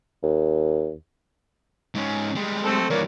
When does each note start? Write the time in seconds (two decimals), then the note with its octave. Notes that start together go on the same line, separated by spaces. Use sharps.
0.23 D#2
1.95 G#2 C#4
2.35 G3 G#3
2.64 A3 C4 A4
2.90 G2 E3 A#3 C#5 D5